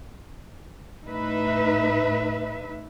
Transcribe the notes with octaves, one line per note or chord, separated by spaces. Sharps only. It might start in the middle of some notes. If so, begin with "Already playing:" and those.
A2 D#4 B4 E5